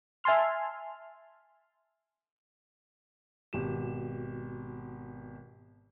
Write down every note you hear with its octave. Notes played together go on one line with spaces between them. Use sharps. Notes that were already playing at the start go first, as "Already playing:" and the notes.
E5 G#5 A5 C6 F6
G#1 B2 G4 E7